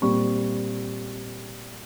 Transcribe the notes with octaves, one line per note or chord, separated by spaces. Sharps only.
A#2 G3 C4 C#6